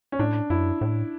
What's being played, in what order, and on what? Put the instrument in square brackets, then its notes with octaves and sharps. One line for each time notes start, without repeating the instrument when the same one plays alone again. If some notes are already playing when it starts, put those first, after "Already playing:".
[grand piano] C#4
[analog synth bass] A2 [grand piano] D4
[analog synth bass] F#2 [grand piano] E4
[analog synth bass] A2